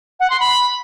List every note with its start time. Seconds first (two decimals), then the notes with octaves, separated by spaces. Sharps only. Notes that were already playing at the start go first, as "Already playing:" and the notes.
0.20 F#5
0.30 C6
0.40 B5